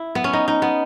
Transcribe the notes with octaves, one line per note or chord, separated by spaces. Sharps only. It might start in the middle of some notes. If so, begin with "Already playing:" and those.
Already playing: E4
B3
C#4
D#4
D#4
B3